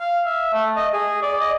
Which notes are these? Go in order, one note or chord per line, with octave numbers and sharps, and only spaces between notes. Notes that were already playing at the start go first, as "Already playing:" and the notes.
F5
E5
A3
D#5
G#4
D5
D#5